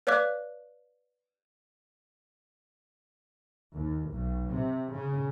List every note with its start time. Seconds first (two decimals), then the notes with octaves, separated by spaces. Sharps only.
0.07 B4 C#5 D5 F5 D6 F#6
3.72 D#2
4.09 B1
4.49 C3
4.92 C#3